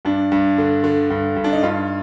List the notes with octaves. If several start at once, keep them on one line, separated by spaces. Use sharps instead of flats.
G2 D4
G2
D3
D3
G2
G2
D4
D#4
G2 F4